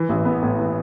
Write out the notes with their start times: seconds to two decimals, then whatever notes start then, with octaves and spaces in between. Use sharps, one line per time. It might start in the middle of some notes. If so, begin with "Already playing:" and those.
Already playing: E3
0.09 A1
0.25 B3
0.43 A2
0.59 E3